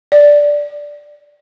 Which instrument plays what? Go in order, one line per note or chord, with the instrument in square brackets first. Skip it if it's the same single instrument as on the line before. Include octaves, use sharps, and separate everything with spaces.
[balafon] D5